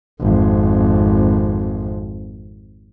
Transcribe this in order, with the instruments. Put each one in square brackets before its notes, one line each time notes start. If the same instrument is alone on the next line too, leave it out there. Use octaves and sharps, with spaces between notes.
[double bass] G#1 F2